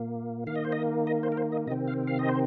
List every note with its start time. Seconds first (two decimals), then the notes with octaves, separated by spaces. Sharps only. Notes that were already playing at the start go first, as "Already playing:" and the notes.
Already playing: A#2 A#3
0.47 D#3 A#3 F5
0.56 D#5
0.65 C5
0.72 D#5
1.07 D#5
1.23 C5
1.32 A#4
1.37 C5
1.52 D#5
1.67 C3 D#5
1.70 D#3 C4
1.88 F5
2.07 F5
2.19 D#5
2.29 C5